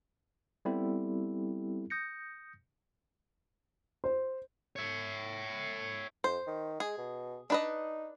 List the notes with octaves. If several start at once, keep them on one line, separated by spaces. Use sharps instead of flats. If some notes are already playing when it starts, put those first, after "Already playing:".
G3 B3 C4 E4 G4 A4
D#6 G6 A#6 C#7
C5
C#5 E5
F2 C5
D#3
G#3 G#4
B2
D4 D#4 B4 D#5